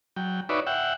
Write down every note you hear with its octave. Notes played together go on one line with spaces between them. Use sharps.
F#3 G5
D#4 F#4 B4 C#5 D5 E5
E5 F#5 G5